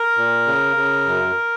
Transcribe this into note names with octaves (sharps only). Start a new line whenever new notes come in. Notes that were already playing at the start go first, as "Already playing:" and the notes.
Already playing: A#4
A#2
C#3
C#3
F#2